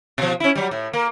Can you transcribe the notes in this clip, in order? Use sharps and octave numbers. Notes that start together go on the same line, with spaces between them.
B2 F3
C#4 E4
F#3 G3
A2
A#3